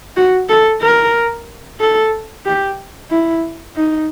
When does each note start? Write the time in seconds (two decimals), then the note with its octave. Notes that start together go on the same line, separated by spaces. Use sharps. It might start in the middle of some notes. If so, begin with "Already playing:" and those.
0.16 F#4
0.49 A4
0.82 A#4
1.80 A4
2.46 G4
3.11 E4
3.76 D#4